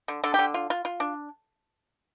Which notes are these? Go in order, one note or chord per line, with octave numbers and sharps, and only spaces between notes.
D3
D3 A4
D3 G4
F4
F4
F4
D4